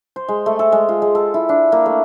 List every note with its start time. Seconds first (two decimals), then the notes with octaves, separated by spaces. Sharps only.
0.16 C5
0.28 G#3
0.46 A3
0.59 A4
0.72 G#3
0.89 F4
1.02 G#3
1.15 A4
1.34 E4
1.49 D4
1.72 A#3
1.86 A3